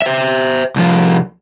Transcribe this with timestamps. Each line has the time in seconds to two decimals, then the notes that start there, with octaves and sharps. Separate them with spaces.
0.02 C5 E5
0.76 C2 F3